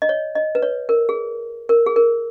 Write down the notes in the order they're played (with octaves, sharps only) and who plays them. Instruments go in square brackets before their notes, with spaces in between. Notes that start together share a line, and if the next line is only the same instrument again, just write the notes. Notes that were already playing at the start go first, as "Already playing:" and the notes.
[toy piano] D#5
C#5
D#5
B4
C#5
A#4
G#4
A#4
G#4
A#4